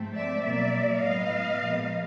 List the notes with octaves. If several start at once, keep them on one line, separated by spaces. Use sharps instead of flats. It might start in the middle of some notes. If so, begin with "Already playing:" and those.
Already playing: G#2 F3 A3 C4
D5 E5
B2 F#3 A#3 D5 E5
A2 F#3 B3 D#5 F5
A#2 F3 G#3 B3